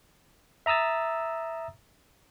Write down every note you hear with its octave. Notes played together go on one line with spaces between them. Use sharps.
E5 A#5 D#6 E6 A6